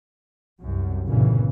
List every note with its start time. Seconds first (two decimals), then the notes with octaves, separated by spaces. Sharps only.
0.60 C2 F#2
1.07 G1 A#2 C#3 E3